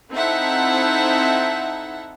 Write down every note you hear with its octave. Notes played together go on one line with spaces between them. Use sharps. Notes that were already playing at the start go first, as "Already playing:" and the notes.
C4 D#4 E4 A4 E5 F#5